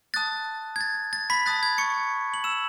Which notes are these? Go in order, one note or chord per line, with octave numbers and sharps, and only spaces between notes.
A5 D#6 F#6 A6
G#6
A6
A6
B5 B6
A5 D#6 F#6 A6
G#6
C#6 C#7
F#7
E6 E7